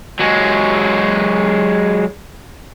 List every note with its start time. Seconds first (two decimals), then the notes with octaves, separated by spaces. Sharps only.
0.19 F#3 G#3